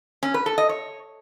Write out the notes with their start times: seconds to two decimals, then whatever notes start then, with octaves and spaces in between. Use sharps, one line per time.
0.23 C#4
0.34 B4
0.46 A4
0.58 D#5
0.69 C#5